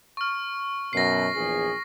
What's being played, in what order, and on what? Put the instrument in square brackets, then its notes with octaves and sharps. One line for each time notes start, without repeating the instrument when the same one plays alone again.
[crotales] C#6 F6
[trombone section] F#2 B2 [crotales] A#6 C7
[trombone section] A#1 E2 G#4